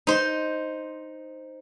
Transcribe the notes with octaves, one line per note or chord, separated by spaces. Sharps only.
D#4 C5